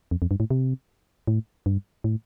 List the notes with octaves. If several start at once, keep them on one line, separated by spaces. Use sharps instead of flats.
F2
F2
G2
A2
C3
A2
G2
A2